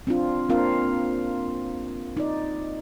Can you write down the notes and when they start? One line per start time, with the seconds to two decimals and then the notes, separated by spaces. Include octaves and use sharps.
0.07 C4 D4 F4
0.49 A#3 C4 D4 F4 A#4 F5
2.17 D#4 D5